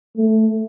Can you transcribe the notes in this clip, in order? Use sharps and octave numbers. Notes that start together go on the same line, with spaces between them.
A3